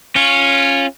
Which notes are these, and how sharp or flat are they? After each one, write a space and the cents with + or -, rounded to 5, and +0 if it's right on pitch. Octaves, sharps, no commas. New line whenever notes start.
C#4 -10 F4 +0